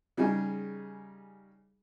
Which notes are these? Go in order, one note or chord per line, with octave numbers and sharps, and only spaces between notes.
C#3 G3 D#4 G#4